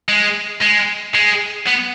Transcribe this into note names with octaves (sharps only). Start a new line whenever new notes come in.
G#3
G#3
G#3
B3